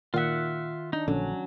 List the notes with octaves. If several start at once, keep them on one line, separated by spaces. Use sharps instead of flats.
A#2 D#3 F4 E5 F#5
D4 D#4
A#1 D3 F#3 C#4